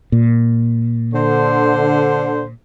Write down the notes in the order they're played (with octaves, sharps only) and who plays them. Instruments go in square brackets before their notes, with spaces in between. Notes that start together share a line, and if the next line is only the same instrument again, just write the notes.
[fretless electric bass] A#2
[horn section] D3 C5